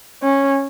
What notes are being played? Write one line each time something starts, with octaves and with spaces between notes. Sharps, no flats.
C#4